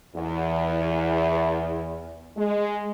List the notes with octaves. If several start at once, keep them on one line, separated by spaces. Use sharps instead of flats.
E2
G#3